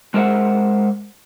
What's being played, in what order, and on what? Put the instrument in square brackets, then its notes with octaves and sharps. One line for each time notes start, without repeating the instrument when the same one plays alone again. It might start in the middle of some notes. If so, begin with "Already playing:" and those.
[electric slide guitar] G#3 A#4 C5 E5 F#5